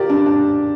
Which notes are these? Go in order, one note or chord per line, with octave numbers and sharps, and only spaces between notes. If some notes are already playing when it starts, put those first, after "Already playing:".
Already playing: F4 G4 A#4 D5
D4
D4